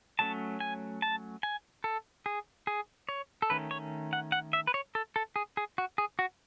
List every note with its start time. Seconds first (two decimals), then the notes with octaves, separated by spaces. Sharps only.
0.19 F#3 A3 C#4 A5
0.60 G#5
1.02 A5
1.43 G#5
1.84 A4
2.26 G#4
2.67 G#4
3.09 C#5
3.42 A4
3.50 D#3 A3 C#4 B4
3.71 C#5
4.13 F#5
4.32 F#5
4.53 E5
4.67 B4
4.74 C#5
4.95 A4
5.16 A4
5.36 G#4
5.57 G#4
5.78 F#4
5.98 G#4
6.19 F#4